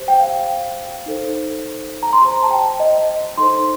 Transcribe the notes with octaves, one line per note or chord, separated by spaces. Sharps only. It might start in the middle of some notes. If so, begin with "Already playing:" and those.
Already playing: G4 C5
G5
F5
D#4 A4 C5
A#5
C6
G4 C5 A#5
A5
G5
D#5
D#4 A4 C5 C6